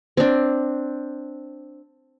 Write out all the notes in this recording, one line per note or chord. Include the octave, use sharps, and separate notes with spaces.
C4 D4